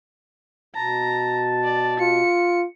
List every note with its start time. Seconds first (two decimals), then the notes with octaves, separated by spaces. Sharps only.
0.75 B2 A5 A#5
1.64 D5
2.00 F4 C#7